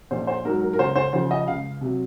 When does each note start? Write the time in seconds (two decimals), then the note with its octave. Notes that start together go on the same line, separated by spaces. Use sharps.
0.11 A#1 C5
0.27 C5
0.45 G#2 A#4
0.48 F#3
0.61 A#4
0.73 A#4
0.79 C#2 C5
0.96 C5
1.13 C#3 F3 C5
1.31 D#5
1.47 C#2 F5
1.81 C3 F#3